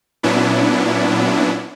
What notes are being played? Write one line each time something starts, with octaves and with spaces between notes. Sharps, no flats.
A#2 F#3 B3 C#4 D4 E4